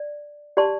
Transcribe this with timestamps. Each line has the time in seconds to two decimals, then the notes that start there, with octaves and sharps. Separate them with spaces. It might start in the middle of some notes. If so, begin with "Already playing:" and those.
Already playing: D5
0.57 G4 D5 A5 C6